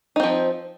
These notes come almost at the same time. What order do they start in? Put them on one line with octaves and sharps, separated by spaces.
D#4 C4 F3